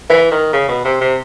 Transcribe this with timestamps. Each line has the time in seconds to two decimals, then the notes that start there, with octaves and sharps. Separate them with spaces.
0.10 E3
0.31 D#3
0.53 C#3
0.69 B2
0.85 C3
1.01 C3